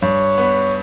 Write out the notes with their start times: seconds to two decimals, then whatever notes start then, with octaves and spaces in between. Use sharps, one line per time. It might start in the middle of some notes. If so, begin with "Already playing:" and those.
0.02 G2 C#5
0.38 B3